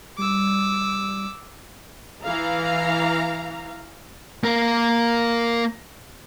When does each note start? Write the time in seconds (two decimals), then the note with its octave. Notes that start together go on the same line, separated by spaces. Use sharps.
0.18 G3 D6 E6
2.24 E3 F5 A#5
4.44 A#3 A#4